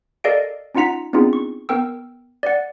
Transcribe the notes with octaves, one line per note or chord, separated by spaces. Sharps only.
A4 A#4 D5 D#5 F5 D7
C#4 D#4 F4 F#5 A#5 B6
B3 C4 D4 D#4 F4 G#4
C#6
B3 A#4 G5 E6
D5 F#5